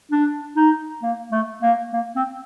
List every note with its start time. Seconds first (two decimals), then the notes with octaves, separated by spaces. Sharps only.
0.11 D4
0.56 D#4
1.03 A#3
1.32 A3
1.62 A#3
1.93 A#3
2.16 C4